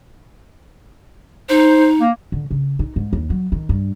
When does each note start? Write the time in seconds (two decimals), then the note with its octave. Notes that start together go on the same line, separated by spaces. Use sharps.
1.49 D#4 C5
2.01 A#3
2.32 D3
2.51 C#3
2.79 D#4
2.96 G#2
3.13 D#2
3.30 F#3
3.52 D#3
3.69 G2